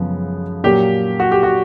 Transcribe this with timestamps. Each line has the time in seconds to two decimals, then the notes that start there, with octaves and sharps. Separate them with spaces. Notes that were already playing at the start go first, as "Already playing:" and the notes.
Already playing: F#2 C#3 F3 G#3 B3
0.64 A#2 F#3 A#3 G4
1.20 F#4
1.31 G4
1.43 F#4